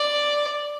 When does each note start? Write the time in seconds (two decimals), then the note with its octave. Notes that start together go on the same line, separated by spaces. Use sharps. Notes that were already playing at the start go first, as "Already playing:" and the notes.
Already playing: D5